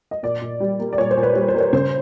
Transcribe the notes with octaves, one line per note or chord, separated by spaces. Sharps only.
D#5
A#2 D5
A#2
G3
A#3
D5
A#2 C#5
C5
A#2
B4
G3
C5
A#3
C#5
C#3 C5